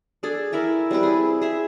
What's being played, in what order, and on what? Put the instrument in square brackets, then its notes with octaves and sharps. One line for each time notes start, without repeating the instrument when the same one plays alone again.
[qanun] D4 G#4 A4
E4 A#4 E5 G#5
G3 C4 E4 B4
G#4
G#4 E5